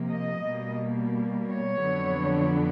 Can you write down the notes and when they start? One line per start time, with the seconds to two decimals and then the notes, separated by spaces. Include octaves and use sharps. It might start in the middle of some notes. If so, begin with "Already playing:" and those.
Already playing: C3 F3 A#3
0.10 D#5
0.45 B2 G3 A#3
1.49 C#5
1.84 F2 D3 F#3 B3 D4